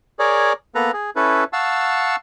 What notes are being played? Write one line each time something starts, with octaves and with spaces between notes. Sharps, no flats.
G#4 A#4 C#5 D5
A#3 B3 A4 B4 A#5
G#4
C#4 E4 A4 B4
F5 F#5 A5 C#6 E6